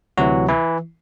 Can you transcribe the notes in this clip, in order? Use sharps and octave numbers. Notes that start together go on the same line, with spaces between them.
D2 C3 E3 F#3 F#4
E3 E4